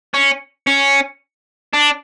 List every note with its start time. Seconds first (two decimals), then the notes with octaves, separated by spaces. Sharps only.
0.14 C#4
0.67 C#4
1.73 D4